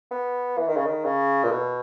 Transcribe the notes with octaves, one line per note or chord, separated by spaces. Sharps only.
B3
E3
D#3
C#3
D#3
C#3
A#2
B2